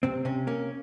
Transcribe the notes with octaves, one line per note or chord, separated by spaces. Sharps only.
C3 C4
C3 C#4
A#3 C#4